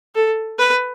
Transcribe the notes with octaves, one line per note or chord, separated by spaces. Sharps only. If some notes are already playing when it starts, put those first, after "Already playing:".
A4
B4